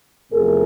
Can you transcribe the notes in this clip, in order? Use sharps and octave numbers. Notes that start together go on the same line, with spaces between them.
E2 C3 F3 A3 G#4 A#4